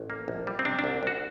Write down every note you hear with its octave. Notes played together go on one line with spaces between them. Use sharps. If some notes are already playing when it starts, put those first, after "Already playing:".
Already playing: A1
A#3
A#1
G3
C4
C3 D4
D4
C2
C2 F#4